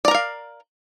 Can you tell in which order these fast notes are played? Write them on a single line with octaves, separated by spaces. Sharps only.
D5 A#5 A#4 F5